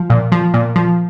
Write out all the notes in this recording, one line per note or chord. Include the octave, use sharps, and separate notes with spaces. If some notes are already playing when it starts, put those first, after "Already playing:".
Already playing: F3
A#2
F3
A#2
F3